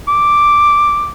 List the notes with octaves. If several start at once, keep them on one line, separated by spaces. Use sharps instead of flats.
D6